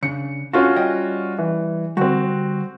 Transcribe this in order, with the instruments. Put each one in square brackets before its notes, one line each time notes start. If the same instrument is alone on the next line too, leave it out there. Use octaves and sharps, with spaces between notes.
[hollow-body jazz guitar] C#3 D4 [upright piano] C#7
[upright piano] C#4 F4 F#4 [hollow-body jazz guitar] D4 A4
[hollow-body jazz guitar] G3 D#5 G5
[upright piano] E3
[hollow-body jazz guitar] D3 G3 [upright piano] C4 F#4